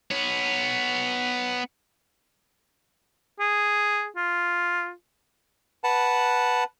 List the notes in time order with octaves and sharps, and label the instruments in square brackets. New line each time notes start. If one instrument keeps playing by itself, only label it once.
[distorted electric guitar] B3 C#5
[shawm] G#4
F4
[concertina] B4 F#5 A5